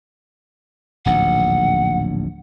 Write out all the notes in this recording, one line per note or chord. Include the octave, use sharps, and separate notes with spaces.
D1 A#1 D#2 F#5